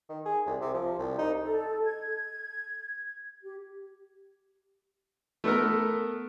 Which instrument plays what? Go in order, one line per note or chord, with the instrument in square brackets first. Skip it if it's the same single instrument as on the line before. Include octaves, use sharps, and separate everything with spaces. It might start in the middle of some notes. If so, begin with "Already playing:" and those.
[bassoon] D#3
G#4
C2
C3
F3
C2
D#4
[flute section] A4
G#6
G4
[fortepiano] A3 B3 A4 A#4